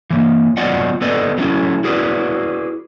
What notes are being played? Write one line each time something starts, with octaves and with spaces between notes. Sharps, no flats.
E3 A#3
F#3 B3 F4 D5 D#5 F#5
B3 A4 B4 D5 D#5
F#3 A3 C#4 E4
E4 F#4 G#4 B4 D5